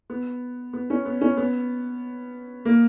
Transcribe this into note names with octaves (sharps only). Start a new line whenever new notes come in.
B3
B3
C#4
B3
C#4
B3
A#3